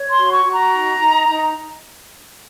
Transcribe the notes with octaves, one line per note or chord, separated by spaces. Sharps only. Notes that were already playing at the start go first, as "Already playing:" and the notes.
Already playing: C#5
C6
F#4
C#6
F#4
A#5
D#4
D#4
D#4